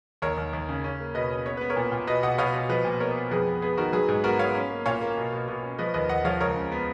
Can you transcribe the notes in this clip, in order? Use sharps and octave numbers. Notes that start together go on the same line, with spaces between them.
D#2 A#4 C#5
D#2
D#2
C#3
C#4
A#3
B2 B4 D#5
C#4
B3 C#5
B3 B4
A#4 C#5
A#2
A#2
B2 B4 D#5
B2 D#5 F#5
B2 C#5 F5
B2
F3 B4 D#5
A#2
B3 A#4 C#5
B3
F2 G#4 B4
B3
B3 G#4 B4
D#3 F#4 A#4
F#3 G#4 B4
G#2
B3 F#4 A#4
B3 C#5 F5
C#4
A#3
A#2 C#5 F5
A#3
B2
B2
B2
C#4
F3 B4 D#5
D#2 B4 D#5
D#2 D#5 F#5
F3 C#5 F5
C#2 A#4 C#5
C#3
B3